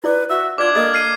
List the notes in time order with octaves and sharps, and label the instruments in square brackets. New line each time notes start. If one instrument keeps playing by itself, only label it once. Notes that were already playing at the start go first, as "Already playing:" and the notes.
[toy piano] E4 D5 D6 [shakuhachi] B4
[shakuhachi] F#4 [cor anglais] E5
[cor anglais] D4 [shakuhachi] F4 [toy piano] B4 D5 [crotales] D6 G#6
[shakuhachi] A#3 [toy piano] A4 D#5 D#6
[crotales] F6 C7 D#7